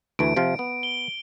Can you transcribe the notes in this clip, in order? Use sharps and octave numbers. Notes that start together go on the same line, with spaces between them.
D2 E3 A3 D7
C3 F3 F4
B3
G7